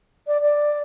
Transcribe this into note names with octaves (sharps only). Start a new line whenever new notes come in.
D5
D5